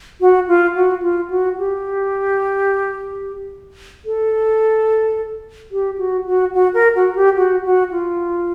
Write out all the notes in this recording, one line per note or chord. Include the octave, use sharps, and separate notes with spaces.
F#4
F4
F#4
F4
F#4
G4
A4
G4
F#4
F#4
F#4
A#4
F#4
G4
F#4
F#4
F4